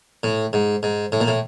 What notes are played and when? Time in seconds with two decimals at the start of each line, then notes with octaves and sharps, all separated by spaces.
0.23 A2
0.53 G#2
0.83 G#2
1.12 A2
1.21 A#2
1.28 A2